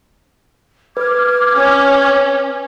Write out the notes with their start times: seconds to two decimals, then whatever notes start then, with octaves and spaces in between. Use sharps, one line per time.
0.97 B4 D6 F6 G#6
1.57 C#4 C#5